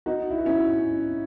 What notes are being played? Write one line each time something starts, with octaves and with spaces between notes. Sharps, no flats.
D#4 F#4
E4
F#4
C#4 E4